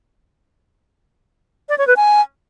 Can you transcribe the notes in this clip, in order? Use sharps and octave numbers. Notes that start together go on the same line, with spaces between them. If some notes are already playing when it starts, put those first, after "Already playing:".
D5
C#5
B4
G#5